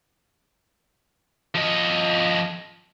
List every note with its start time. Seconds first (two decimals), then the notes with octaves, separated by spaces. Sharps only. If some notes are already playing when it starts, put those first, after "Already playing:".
1.55 F3 D#5